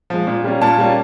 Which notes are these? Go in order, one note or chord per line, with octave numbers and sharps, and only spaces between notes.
F3 G#3
A#2
G3 A#3 C#4
A#2 A5
G3 A#3 C#4